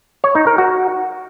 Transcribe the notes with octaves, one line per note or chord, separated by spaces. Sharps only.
C#5
D#4
A#4
F#4